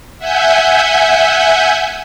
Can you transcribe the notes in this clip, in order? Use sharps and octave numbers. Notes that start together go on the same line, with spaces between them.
E5 F#5 G#5 G6